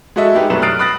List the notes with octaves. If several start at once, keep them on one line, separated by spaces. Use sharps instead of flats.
G#3 F#4 A4 D#5 E5
G#3 D#4 G4 B4
C2 F#2 B2 A3 B4 E7
D#6 F6 F#6 A6 C7 D7
B5 D#6 F#6 A6 A#6